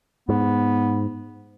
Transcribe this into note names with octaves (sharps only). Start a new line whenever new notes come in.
G#2 B3